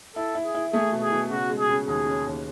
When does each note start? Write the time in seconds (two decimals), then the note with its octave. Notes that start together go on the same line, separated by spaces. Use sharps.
0.16 E4 A4
0.35 E4
0.44 G#4
0.54 E4
0.73 A3 G#4
0.92 B2
1.02 G#4
1.12 B2
1.30 C#3 F#4
1.49 G#3
1.59 G#4
1.69 C#3
1.88 D#2 G#4
2.06 C#4
2.26 D#2